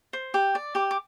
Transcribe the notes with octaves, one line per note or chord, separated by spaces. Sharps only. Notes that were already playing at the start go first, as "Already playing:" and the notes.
C5
G4
D5
G4 D6
D6